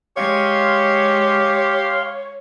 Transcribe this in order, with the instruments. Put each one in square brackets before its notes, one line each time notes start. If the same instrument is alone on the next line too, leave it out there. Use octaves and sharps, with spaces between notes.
[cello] G#3 [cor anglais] G4 [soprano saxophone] C#5 [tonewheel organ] F5 C6